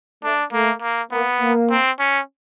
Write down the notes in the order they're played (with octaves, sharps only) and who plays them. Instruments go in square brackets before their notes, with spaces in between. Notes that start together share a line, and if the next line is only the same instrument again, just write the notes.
[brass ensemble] A3 [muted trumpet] D4
[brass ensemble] A3 [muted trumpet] A#3
[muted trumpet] A#3
[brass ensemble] A#3 [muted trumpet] B3
[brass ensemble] A#3
[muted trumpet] C4
C#4